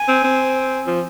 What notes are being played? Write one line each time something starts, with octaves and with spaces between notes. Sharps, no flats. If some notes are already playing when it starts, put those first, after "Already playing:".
Already playing: G#5
C4
C4
F3